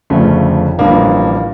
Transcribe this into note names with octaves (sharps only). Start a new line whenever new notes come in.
G1 F2 C#3 F3 A3
A1 G2 D3 F3 A#3